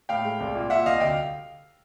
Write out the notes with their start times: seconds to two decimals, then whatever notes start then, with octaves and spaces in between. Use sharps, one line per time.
0.09 A2 F5 G5
0.25 G#3
0.40 C2
0.55 A#2
0.70 A#2 E5 F#5
0.86 C2 D#5 F5
1.00 D2 F5 G5